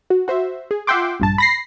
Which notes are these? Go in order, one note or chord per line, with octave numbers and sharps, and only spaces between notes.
F#4
F#4 C5 E5
G#4
F4 E5 F#5 G5 C6 D6
A#1 G2 A5
B5 A#6 C7